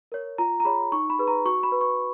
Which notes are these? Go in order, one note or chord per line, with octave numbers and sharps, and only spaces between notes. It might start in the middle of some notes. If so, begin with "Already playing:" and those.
A#4 C#5
F4 A#5
A#5
G#4 C#5 B5
D#4 C#6
B5
G#4 B4
A#5
F#4 C#6
B5
B4
C#6